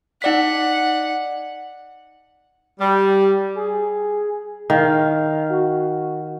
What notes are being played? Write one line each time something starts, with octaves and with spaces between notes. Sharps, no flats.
D#4 D5 F#5 B6
G3
G#4
D#3 F5
F#4